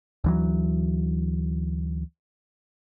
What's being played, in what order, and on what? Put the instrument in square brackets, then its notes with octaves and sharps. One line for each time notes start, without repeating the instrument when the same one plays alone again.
[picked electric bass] D2 E3 F#3